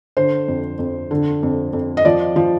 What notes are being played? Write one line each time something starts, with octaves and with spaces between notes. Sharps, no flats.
D3 C5
F2
F2
D3
F2
F2
D#5
F3 D5
F3